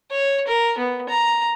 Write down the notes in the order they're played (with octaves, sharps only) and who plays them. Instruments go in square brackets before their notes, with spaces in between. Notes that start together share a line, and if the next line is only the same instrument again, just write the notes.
[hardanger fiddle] C#5
A#4
B3
A#5